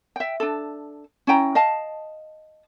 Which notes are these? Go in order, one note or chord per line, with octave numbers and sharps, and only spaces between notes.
E5 G5
D4 A4
C#4 E4 G5 A#5
D#5 F5 A5